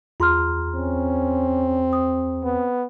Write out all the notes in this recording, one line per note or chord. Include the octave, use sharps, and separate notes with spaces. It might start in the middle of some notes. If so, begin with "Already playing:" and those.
E2 F4 G#4 A#5 C6 F6
C4 C#4
D#6
B3